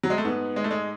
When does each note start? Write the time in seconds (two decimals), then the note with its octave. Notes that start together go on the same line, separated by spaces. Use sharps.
0.03 F#3
0.10 G#3
0.18 A3
0.25 G#2 B3
0.56 G#3
0.64 A3
0.71 G#3